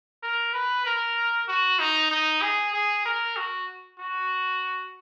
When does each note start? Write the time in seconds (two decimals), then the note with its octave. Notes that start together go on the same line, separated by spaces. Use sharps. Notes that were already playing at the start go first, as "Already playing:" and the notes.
0.23 A#4
0.53 B4
0.85 A#4
1.48 F#4
1.79 D#4
2.11 D#4
2.42 G#4
2.73 G#4
3.05 A#4
3.37 F#4
3.99 F#4